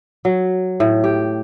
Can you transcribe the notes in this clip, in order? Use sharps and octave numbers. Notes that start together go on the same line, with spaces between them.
F#3
A2
G4